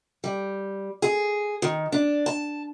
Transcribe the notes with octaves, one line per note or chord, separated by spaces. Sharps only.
G3
G#4
D#3
D4
A5